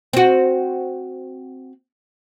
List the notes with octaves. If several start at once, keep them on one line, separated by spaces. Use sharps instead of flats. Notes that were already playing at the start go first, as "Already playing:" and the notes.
C4 F#4